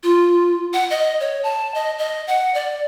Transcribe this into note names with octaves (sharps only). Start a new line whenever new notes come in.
F4
F#5
D#5
C#5
A5
D#5
D#5
F#5
D5